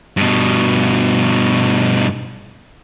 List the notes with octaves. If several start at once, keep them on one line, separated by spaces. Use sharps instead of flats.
G2 B2